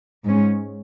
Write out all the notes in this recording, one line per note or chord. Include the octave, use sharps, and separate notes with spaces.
G#2 G#3 C#4